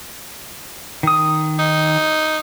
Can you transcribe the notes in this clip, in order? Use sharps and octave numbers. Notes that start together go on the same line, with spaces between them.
D#3 D#6
D#4